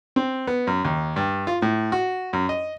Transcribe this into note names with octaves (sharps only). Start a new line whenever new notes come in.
C4
B3
F#2
D#2
G2
F4
A2
F#4
F#2
D#5